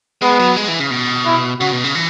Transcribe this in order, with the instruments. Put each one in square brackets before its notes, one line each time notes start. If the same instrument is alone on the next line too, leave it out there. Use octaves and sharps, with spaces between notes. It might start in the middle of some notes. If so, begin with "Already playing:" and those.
[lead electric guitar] G#3 [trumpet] B3
[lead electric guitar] F#3
G#3
E3
C#3
B2
[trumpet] E4
[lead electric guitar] C#3 [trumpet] F#4
[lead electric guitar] B2
C#3
E3